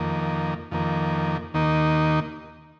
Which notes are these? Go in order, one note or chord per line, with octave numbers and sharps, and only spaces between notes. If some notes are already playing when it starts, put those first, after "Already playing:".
Already playing: F2 D#3 A#3
F2 D#3 A#3
D#2 D#3 A#3 D#4